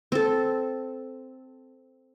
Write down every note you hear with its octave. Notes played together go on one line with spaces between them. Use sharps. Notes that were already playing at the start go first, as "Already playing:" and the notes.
C4 A4